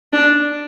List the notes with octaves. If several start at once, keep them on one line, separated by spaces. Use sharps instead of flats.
D4